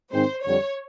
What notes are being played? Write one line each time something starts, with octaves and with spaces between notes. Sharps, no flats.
G#2 D#3 G#3 C4 C5
F2 D3 G3 C#5